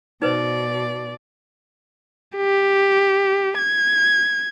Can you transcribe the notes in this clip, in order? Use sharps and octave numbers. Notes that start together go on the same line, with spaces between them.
B2 D#4 B4 C5 D5
G4
G#6